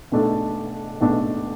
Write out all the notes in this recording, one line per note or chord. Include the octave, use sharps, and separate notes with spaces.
B1 B2 A3 D4 A4
B1 B2 A3 D4 A4